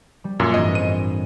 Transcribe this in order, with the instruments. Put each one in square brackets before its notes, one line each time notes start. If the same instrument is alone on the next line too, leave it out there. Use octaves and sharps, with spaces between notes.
[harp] G3
[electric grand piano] F#2 A#2 [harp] F4 A4 A#4
[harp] A1 G2 C4 [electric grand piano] D#5
[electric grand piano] D#7